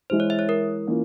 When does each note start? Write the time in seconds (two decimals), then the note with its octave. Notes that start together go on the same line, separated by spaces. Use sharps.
0.10 E3 G#3 E4 C5
0.20 C#5
0.30 E5
0.39 C#5
0.49 A#4
0.87 E3 A#3 C#4 F4